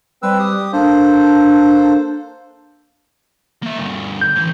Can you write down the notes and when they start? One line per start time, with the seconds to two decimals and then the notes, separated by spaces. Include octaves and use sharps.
0.23 G3 C4 B4 E6
0.39 G4 D#6
0.73 A#3 D4 A4 C5
3.63 A#3 E5
3.78 D2 G2
4.21 G6
4.36 A2 E3